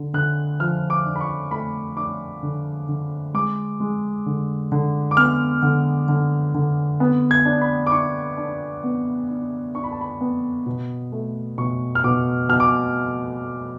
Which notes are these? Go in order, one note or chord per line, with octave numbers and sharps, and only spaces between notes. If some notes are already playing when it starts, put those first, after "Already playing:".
Already playing: D3
D3 F#6
F3 F6
D6
D4
B5
C#6
A3 B5
D4 D6
D3
D3
G#3 D6
G#3
D3
D3
D6
B3 F6
D3
D3
D3
B3
G#6
D4
B5
D6
D4 C#6
D4
B3
D4
D4 C#6
B5
A5
B5
B3
B2
A3
B2 C#6
F6
B2 D6
B2 F6
D6